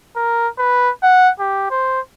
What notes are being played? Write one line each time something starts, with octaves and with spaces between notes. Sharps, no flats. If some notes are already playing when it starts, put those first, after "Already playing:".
A#4
B4
F#5
G4
C5